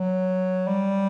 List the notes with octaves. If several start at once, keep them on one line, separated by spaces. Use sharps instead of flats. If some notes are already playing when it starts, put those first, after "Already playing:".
Already playing: F#3
G3